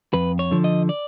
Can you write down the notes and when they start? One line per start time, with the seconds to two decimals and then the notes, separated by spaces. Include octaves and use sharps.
0.14 F2 B4
0.39 C#5
0.51 D3 F3
0.64 D#5
0.89 D5